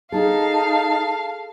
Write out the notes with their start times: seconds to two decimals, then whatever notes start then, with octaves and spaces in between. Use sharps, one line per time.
0.12 D#4 G#4 A4 F5 A5